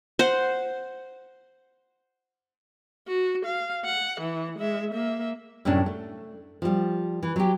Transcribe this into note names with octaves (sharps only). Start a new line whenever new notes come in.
C5 F#5
F#4
F5
F#5
E3
G#3 E5
A#3 E5
F#2 A2 C3 C#4 D4
A3
F3 G3
E3
F#3 G4